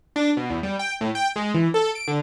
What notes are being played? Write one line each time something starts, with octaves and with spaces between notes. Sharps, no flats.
D4
B2
E2
G3
G5
A2
G5
G#3
E3
A4
D7
D3